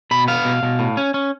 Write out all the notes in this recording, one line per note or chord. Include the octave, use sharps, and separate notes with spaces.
B2 B5
B3 F5
B2
B2
A2
C#4
C#4